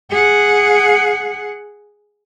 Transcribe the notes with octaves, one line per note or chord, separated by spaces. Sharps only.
G#4 F#5